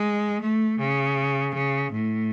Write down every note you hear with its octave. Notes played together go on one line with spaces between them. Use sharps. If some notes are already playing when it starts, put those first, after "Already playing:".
Already playing: G#3
A3
C#3
C#3
A2